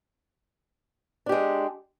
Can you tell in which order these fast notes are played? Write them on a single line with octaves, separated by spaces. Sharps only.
D4 G4 G#3